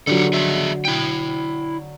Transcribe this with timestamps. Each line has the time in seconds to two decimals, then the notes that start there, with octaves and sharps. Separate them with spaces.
0.07 D3 F#3 F4 G4 A4
0.33 G#4 D#5 E5
0.85 E4 G5